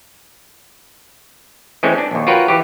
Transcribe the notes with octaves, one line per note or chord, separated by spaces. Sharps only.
E3 G#3 A3 C4 C#4
D4
A#1 D#2
F4 F#4 A#4 B4 C#5 G5
E3 G4